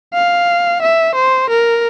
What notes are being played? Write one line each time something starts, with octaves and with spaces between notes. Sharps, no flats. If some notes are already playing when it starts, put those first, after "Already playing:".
F5
E5
C5
A#4